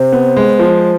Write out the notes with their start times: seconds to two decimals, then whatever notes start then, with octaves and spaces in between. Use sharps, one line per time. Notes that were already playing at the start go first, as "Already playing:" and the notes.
Already playing: C3 C5
0.12 B3
0.37 G#3
0.59 F3